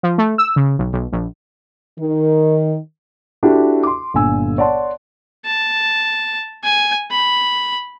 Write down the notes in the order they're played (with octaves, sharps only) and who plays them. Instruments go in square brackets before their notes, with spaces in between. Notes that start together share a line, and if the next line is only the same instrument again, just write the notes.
[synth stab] F3
A3
E6
C#3
B1
B1
A#1
[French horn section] D#3
[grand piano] D4 E4 F#4 G4 A4
C6 D6
G1 A#2 D3 G#5 E6
C#5 D5 F#5 A5 C6
[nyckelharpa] A5
G#5
B5